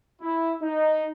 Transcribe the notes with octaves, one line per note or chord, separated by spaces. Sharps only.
E4
D#4